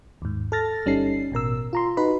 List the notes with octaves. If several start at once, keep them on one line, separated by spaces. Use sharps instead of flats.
D#2 G#2
A4 F6 A6 A#6
G1 G3 C#4 D#4 A4 C7
A1 B2 A#4 E6
F4 A#5 C6
D#4 F#4 B4 B5